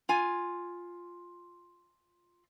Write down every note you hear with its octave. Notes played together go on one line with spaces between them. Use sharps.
F4 G#5